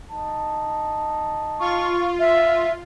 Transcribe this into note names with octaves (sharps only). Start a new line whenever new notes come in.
D#4 A5
F4 C#6
E5